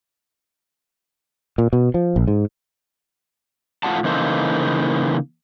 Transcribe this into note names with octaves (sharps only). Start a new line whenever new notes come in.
A#2
B2
F3
A#1
G#2
A2 F4 F#4 F#5 A5
C#3 E3 A#3 D#4 A4 C5